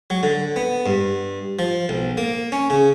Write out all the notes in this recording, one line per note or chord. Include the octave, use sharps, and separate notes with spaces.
F#3
D3
B3
G2
F3
B1
A#3
C#4
C#3